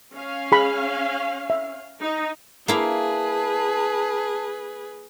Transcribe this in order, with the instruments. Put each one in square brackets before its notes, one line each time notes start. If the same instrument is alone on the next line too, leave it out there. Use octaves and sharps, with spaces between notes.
[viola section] C#4 F5
[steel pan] G#4 B5
E5
[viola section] D#4
[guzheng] A#3 E4 F5 [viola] G#4 B4 [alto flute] A5